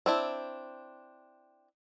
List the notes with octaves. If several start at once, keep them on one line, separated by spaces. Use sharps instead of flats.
C4 D4 E4